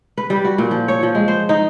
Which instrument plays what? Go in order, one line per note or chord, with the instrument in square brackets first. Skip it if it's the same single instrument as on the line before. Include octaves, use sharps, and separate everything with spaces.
[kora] B4
G3
F#4
A#2
F3
C#5
F3
G#3
C5
D#4